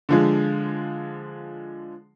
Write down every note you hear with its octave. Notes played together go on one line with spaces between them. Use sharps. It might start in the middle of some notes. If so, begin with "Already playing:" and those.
D3 F3 G#3